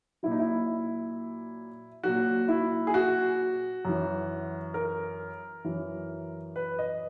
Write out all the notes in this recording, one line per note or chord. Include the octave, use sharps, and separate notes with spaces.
A#2 F#3 E4
D#4
E4
A#2 F#3 F#4
E4
G#4
F#4
F#2 E3
A#4
F#2 E3
B4
D#5